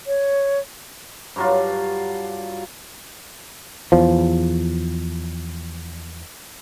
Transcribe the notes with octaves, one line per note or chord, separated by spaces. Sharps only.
C#5
G2 F#3 F4
E2 F3